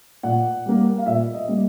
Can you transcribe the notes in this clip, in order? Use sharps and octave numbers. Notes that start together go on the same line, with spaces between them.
A#2 F#5
G3 A#3
F5
A#2 E5
D#5
G3 A#3